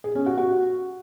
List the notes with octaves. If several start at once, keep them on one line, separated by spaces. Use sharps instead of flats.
G#4
C#4
F#4
F#4